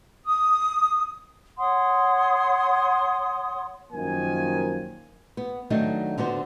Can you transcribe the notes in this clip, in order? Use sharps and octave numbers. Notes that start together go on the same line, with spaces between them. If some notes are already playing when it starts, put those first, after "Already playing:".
D#6
C#5 F#5 C6 D#6
F#2 D#3 F3 A#3 G#5
B3
D#3 F#3 A3 D4 D#4
D3 B3 F#4 C5